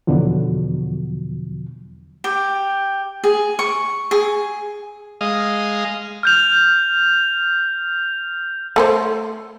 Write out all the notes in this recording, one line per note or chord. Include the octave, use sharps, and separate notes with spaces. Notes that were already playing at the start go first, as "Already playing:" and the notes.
E2 B2 D3 F3 F#3
G4
G#4
C#6
G#4
G#3 D#5 F5
F6 G6 F7
A3 A4 C5